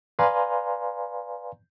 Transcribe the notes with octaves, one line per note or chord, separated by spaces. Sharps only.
B4 D5 F5 G#5 A#5 C6